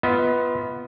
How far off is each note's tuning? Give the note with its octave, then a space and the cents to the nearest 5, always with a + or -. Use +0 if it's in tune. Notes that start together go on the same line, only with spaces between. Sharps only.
B3 +0 F4 -5 D#5 +45